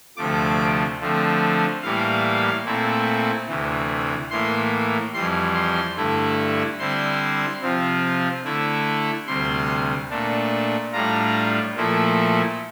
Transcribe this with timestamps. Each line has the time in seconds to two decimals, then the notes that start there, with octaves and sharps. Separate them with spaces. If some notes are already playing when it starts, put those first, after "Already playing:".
0.16 D2 C3 F3 A3 D6
1.00 D3 F3 A3 C4
1.82 A2 E3 G3 A#3 F5
2.65 A#2 A3 C4 E4
3.48 D2 C3 E3
4.30 A2 E3 A#3 C6
5.14 F2 E3 G3 C6
5.54 C6
5.96 G2 D3 A3 E4
6.79 D3 G3 C4 E4 C6
7.62 C3 F3 C4 F4
8.44 D3 A3 E4
9.27 D2 C3 G3 C6
10.10 A#2 A3 D4
10.92 A2 G3 D4 F4 A#5
11.75 A#2 F3 A3 E4